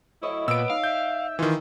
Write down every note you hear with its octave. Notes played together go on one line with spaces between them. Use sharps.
F#3 A3 E4 C#5 D#5
A#2 B3 E6 D7
D#4 F5
E5 G6
D#3 E3 F4